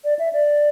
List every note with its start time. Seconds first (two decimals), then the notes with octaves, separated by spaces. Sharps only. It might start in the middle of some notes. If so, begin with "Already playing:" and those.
0.04 D5
0.19 E5
0.33 D5